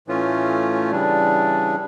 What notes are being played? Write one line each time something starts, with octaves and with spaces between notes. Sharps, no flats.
A2 E3 A3 C#4 F4
C#3 E3 G3 D4